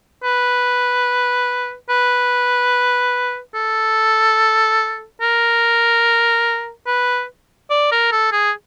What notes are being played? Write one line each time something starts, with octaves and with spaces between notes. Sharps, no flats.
B4
B4
A4
A#4
B4
D5
A#4
A4
G#4